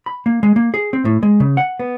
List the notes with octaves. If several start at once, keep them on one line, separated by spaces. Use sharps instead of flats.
B5
A#3
G#3
A#3
G#4
C4
A2
G#3
C#3
F#5
B3